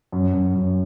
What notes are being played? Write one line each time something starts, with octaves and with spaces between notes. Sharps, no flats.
F#2
F#2
F#2